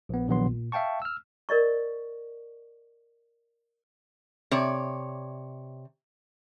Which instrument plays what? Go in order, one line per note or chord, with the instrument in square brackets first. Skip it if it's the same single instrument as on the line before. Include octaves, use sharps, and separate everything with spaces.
[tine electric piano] A#1 B3
A#1 D#3 F#3 B3 C6
A#2
E5 F5 G5 A5 C#6
E6 F6
[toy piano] A#4 D5 D#5 C#6
[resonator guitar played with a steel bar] C3 C#5 D5